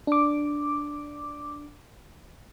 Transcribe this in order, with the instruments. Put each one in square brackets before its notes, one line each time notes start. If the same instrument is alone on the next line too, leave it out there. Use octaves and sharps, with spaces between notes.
[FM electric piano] D4 D6